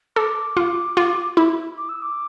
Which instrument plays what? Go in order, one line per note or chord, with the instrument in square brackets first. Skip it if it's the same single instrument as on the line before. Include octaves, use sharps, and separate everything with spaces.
[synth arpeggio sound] A4 [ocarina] D6
[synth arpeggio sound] F4
F4
E4
[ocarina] D6
E6
D6